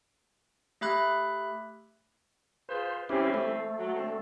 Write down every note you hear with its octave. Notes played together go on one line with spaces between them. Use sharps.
A3 G4 E5 B5 F#6
F4 G#4 B4 C5
E3 G3 C4 C#4 E4 G4
A3
F#3
D3 C4